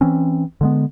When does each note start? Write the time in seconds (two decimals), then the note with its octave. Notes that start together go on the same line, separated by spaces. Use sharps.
0.01 E3 C4 C#4
0.61 D3 G#3 B3